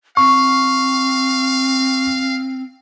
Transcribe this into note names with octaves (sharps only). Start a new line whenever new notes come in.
C4 F5 C#6